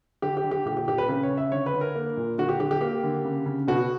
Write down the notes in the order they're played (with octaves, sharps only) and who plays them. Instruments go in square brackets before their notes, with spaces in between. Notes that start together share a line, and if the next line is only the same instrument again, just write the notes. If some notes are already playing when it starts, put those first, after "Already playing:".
[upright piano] D3 G4
G4
D3
G4
A#2 G4
G4
A#2 G4
B4
C#3 B4
C#5
C#3
E5
D3 C#5
B4
D3
A#4
A#3
A#2
D3 F#4
G4
D3 G4
G4
A#3 G4
D3
C#3
C#3
B2 F#4